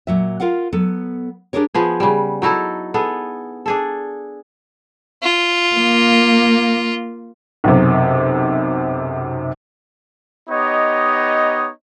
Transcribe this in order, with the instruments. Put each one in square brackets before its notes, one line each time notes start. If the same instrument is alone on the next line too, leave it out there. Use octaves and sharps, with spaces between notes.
[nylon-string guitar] A#2 F#3 E5
F4 A#4 F5 F#5
F#3 B3 A4
D4 G4 G#4 A#4 C#5
[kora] F3 B3 G#4
C#3 G3
F#3 D#4 E4 A4
B3 G#4 A4
D4 G#4 A4
[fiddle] F4
[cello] A#3
[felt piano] B1 F#2 C3
[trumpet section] B3 D#4 G4 C#5 D#5